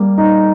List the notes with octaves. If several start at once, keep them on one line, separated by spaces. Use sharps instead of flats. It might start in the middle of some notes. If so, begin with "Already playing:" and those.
Already playing: G3 A#3
D#4